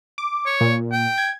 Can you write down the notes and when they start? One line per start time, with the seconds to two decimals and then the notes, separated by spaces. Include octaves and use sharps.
0.18 D6
0.46 C#5
0.61 A#2
0.92 G5
1.18 G#6